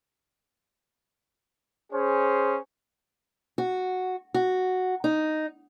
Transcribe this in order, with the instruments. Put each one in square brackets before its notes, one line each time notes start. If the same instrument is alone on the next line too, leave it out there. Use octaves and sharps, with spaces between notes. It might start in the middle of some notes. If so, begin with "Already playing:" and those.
[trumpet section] C#4 G#4 C5
[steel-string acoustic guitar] F#4
F#4
D#4